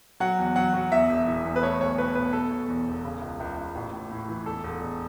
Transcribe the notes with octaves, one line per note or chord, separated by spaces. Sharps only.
F#3 F#5
E2
F#3 F#5
F#3
E2 E5
E1
E3
E2
B4
A3 C#5
B1 C#5
B2 B4
B1 B4
B2 A4
B2
E2
E1
C#3
C#2
C#2
C#2
A1
A2
A2
E3
E1 A4
E1
E1